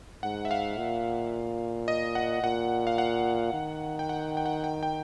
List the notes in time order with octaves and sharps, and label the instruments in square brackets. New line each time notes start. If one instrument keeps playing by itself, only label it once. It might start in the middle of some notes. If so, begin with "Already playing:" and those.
[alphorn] G#2 [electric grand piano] F#5
[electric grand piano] E5
F5
[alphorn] A#2
[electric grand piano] D#5
F#5
[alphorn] A#2 [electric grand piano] F#5
[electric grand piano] F5
F#5
[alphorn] D#3
[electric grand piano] G5
F#5
G5
F#5
G5
G5